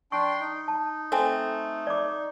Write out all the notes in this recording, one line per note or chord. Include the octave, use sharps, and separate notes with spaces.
D4 G5 C6 C#6
D#4
A5
A3 C4 G#5
D5 D6